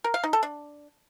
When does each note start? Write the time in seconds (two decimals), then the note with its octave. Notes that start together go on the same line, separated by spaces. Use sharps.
0.04 A#4
0.14 F5
0.24 D#4
0.33 A4
0.43 D4